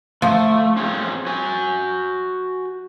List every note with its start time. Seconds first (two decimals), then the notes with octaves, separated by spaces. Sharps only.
0.22 F3 A3
0.77 C4 C#4 G#4
1.27 F#4 G#5